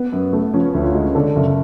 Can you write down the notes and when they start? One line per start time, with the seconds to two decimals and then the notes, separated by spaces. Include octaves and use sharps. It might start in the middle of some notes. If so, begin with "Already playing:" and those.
Already playing: B3
0.12 F#2
0.33 A3
0.54 F3 C#4
0.75 D2
0.85 F4
0.95 G#3
1.15 D3 A4
1.36 F#1